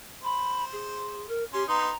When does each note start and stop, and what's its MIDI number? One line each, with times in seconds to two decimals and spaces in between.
0.24 1.30 72
0.24 0.64 83
0.72 1.26 68
1.28 1.43 70
1.53 1.63 61
1.53 1.63 67
1.53 1.63 84
1.68 1.90 59
1.68 1.90 63
1.68 1.95 82
1.68 1.90 84